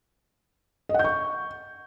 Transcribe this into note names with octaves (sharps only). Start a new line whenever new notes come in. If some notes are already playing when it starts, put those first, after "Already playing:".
D#5
F#5
G6
C#6